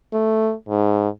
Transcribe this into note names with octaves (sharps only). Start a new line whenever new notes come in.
A3
G#2